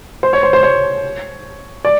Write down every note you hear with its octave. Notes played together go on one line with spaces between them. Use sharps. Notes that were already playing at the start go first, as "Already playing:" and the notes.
C5
C#5
C5
C5
C#5
D5